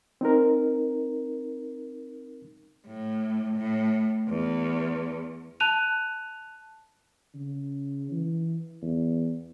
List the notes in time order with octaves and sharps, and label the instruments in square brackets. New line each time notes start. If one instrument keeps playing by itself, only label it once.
[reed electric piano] C4 D#4 A#4
[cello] A2
A2
E2
[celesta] A5 F#6 D#7 F7
[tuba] C#3
E3
E2